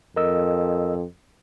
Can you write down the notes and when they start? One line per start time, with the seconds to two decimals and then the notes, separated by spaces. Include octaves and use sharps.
0.16 F2 A#4 D#5 E6